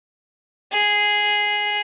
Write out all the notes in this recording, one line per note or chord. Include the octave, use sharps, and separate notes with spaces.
G#4